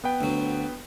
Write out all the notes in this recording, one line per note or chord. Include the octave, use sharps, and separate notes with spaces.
B3 B4 G5
D2 F#3